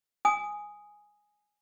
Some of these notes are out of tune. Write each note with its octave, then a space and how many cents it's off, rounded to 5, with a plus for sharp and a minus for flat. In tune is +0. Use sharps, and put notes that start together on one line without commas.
G#5 +0 D#6 +0